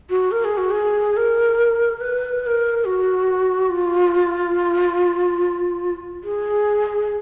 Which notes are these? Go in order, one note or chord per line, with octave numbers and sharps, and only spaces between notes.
F#4
A#4
G#4
F#4
G#4
A#4
B4
B4
A#4
F#4
F4
G#4